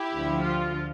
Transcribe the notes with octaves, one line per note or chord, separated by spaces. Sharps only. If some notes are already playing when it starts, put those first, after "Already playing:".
Already playing: E4 G4
D2 D3 F3
F4